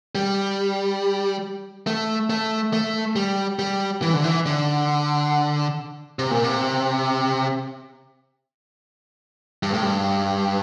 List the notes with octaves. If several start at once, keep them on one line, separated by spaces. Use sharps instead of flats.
G3
A3
A3
A3
G3
G3
E3
D3
E3
D3
C3
A#2
C3
G2
A2
G2